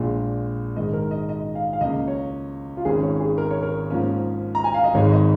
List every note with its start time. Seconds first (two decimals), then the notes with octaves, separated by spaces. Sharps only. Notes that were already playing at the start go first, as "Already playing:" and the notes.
Already playing: A#1 A#2 G#3
0.76 G#2 D#3 G#3 D#5
0.93 A#4
1.11 D#5
1.29 D#5
1.55 F5
1.73 F5
1.81 C#2 C#3 A#3 D#5
2.08 C#5
2.77 F4
2.85 G#1 G#2 D#3 C#4 G#4
3.03 C#5
3.20 G#4
3.38 A#4
3.51 C#5
3.63 A#4
3.90 G#2 F3 A#3 C#4
4.55 A#5
4.64 G#5
4.74 F5
4.84 D#5
4.94 G#1 G#2 G#3 D#4 C#5
5.12 D#5